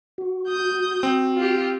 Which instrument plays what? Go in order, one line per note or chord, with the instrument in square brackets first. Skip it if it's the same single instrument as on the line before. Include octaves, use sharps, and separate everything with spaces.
[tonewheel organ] F#4
[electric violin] D#6 G6
[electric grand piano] C4
[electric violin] F4 G4